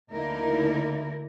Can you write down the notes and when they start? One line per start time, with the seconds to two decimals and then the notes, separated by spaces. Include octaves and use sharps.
0.12 D2 D3 A#3 D#4 E4 A#4